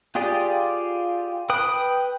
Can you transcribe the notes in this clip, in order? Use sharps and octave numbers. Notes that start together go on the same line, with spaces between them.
F4 G4 G#4 D5
B4 G5 D#6